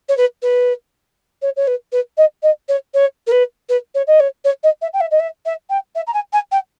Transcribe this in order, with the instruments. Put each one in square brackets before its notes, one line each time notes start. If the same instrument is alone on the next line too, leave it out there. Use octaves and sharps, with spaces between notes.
[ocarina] C#5
B4
B4
C#5
C#5
B4
B4
D#5
D#5
C#5
C#5
A#4
B4
B4
C#5
D#5
C#5
C#5
D#5
E5
G5
E5
D#5
E5
E5
G5
E5
A#5
G#5
G#5
G5